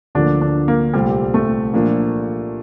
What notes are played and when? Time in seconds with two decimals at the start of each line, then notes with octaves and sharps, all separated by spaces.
0.15 D2 D3 F3 A#3 D4
0.41 D4
0.68 A#3
0.94 C2 A#2 G3 A3 C4 G4
1.34 A3
1.73 A#2 F3 A#3 D4